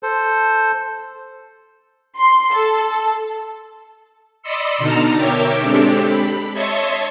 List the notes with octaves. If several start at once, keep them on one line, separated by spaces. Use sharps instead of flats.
A4 C5
C6
A4
D5 D#5 B5 C6 E6 C#7
B2 D3 D#4 A5 A#5 F6
A#4 C#5 E5 G5 D6
G#3 C4 D4 G4 A4
B5
C#5 D#5 E5 A5 C6 C#6